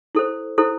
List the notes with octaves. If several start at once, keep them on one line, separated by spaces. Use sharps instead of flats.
E4 A4 C5
E4 A4 C5